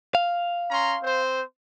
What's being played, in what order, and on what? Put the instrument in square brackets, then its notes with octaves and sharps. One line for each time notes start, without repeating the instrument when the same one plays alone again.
[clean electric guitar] F5
[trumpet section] C#4 A#5 C6
C4 C5